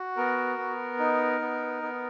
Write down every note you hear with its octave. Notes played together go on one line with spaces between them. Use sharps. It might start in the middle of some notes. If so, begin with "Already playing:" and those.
Already playing: F#4
B3 A#4
B3
D#4
B3
B3